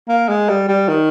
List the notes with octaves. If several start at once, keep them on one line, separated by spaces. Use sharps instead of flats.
A#3
G#3
G3
G3
D#3